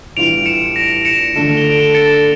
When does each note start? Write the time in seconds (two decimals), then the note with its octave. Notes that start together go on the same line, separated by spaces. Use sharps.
0.17 A2 E3 G3 D4 F4 D7 F7
0.46 C#7 E7
0.76 A#6 D7
1.05 C#7 E7
1.35 D3 A3 D4 F4 A4
1.57 G7
1.64 D7 F7
1.80 E7 G7
1.95 A6 C#7